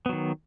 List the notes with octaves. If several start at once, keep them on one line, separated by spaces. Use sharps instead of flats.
D#3 F#3 B3